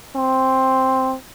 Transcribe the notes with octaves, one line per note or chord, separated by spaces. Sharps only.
C4